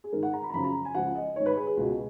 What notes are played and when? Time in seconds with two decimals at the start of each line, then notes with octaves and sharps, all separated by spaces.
0.04 G#4
0.12 G#2 D#3 A#4
0.23 F#5
0.33 A#5
0.43 B5
0.50 A#5
0.54 F#2 C#3 F3 B5
0.64 A#5
0.85 G#5
0.94 C#2 C#3 F3 F#5
1.15 D#5
1.36 G#2 D#3 C#5
1.46 B4
1.57 G#4
1.67 G#4
1.77 C#2 B2